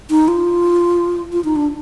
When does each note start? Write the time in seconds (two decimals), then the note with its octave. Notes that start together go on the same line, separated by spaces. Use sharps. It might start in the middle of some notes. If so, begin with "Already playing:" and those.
0.10 D#4
0.28 F4
1.33 F4
1.44 D#4
1.56 D4